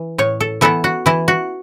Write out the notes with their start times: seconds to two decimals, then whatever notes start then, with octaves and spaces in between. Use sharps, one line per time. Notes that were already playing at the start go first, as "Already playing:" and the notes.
Already playing: E3
0.18 A2 C#5
0.40 A4
0.61 E3 B3 E4 A4
0.84 F#4
1.06 E3 E4
1.28 F#4